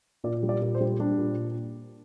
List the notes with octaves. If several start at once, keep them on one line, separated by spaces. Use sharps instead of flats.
A#2 D5
G3
D5
A#2
C5
G3
G3 D4
A#2